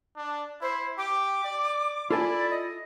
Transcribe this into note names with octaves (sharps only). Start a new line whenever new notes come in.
D4
E4 C5
G4 D6
D5
E4 F4 A4 D5 G#5
D#5